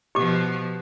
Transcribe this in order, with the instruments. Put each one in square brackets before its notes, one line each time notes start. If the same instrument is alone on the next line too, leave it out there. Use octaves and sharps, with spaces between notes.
[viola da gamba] B2 F3 [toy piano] G4 D6